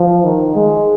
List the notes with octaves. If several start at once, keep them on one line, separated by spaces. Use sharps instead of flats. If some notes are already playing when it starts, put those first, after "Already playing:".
Already playing: F3
D#3
G#3